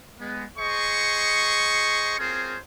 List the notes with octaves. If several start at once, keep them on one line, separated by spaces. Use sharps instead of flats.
G#3 B3
G#4 C5 D#5 C#6
C4 F4 G#4 A#4 C5 C#5